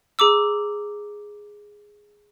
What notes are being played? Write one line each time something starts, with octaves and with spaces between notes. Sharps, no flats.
G#4 A#5 D6 E6